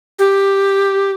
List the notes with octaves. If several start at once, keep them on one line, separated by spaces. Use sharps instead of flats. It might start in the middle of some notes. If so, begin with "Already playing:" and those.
G4